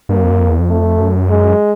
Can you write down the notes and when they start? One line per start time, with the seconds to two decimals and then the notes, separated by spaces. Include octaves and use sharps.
0.09 G2 A#3
0.17 F#2
0.24 F2
0.31 F#2
0.40 F2
0.49 E2
0.60 F2
0.70 A3
1.00 F#2
1.30 G#3